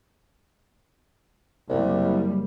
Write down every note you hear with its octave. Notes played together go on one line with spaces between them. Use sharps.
F#1 C2 G3